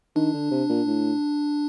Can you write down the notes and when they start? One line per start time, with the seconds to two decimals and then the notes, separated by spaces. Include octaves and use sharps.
0.16 D#3 D4
0.34 D3
0.51 C3
0.69 A#2
0.87 A2